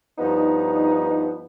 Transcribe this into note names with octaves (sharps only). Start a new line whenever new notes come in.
G2 F3 B3 D#4